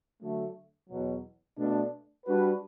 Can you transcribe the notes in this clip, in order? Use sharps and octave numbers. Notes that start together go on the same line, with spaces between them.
D3 F#3 A3
E2 B2 F#3
B2 A3 D4
G3 D4 F#4 B4